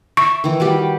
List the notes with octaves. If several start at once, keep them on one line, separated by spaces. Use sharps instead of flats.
E5 C#6
D#3 E3
G3 F#4 G4